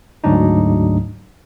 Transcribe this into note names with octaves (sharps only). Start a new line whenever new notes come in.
D2 G#2 F#3 D4 D#4